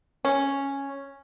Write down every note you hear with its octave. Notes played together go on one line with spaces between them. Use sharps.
C#4